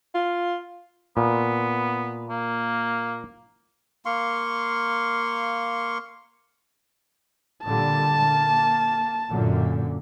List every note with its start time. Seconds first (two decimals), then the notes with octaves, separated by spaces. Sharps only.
0.15 F4
1.17 A#2 B3
2.30 A#3
4.05 A#3 F5 C6 C#6
7.65 A#2 D3 G3 A5
8.23 A#3
9.29 F#2 A#2 D3